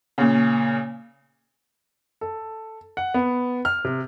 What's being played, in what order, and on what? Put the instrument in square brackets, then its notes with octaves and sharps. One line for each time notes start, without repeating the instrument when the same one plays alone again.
[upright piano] A#2 C#3
A4
F#5
B3
F6
C3